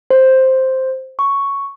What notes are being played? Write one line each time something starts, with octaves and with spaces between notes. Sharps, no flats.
C5
C#6